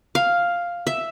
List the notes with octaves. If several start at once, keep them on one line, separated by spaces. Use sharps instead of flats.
F5
E5